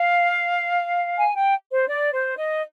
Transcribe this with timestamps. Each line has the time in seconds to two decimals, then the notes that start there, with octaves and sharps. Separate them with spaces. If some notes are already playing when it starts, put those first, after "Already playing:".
Already playing: F5
1.17 G#5
1.35 G5
1.70 C5
1.88 D5
2.12 C5
2.36 D#5